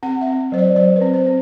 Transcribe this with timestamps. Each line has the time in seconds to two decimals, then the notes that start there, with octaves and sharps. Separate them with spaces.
0.03 C4 F#5
0.21 E5
0.27 C4
0.52 F#3 C5
0.59 D5
0.76 F#3 C5
0.96 B4
1.01 C4
1.14 C5
1.27 C4